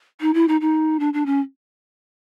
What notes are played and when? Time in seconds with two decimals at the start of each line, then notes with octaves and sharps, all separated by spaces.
0.21 D#4
0.34 E4
0.48 D#4
0.61 D#4
1.00 D4
1.14 D4
1.26 C#4